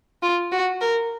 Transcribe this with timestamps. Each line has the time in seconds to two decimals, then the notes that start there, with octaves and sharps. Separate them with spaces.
0.22 F4
0.52 F#4
0.81 A#4